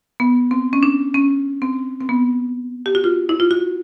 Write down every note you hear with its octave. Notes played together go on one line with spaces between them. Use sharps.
B3
C4
C#4
D4
C#4
C4
C4
B3
G4
F#4
F4
E4
F4
F#4